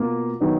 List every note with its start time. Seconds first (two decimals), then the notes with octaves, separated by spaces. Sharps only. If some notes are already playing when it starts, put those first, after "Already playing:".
Already playing: B2 A#3 F4
0.40 D#3 F#3 B3 D#4